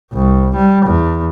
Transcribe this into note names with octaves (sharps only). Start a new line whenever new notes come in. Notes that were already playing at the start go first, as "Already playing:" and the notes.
C2
G3
E2